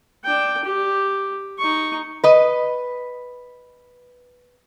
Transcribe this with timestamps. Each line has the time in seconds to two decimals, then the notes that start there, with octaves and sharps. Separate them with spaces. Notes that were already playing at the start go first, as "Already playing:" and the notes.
0.24 D4 G5
0.64 G4
1.58 D#4 C#6
2.24 B4 D#5